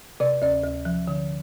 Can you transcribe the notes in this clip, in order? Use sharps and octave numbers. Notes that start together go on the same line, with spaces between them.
C3 D5
D2 D5
D2
F3
D3